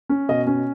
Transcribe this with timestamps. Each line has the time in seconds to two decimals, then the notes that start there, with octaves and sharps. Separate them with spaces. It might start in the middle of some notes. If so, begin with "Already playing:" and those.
0.09 C#4
0.29 B2 D#5
0.47 C#4